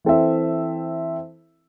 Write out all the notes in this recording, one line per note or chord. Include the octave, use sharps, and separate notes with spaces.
E3 C4 A4 C5 E5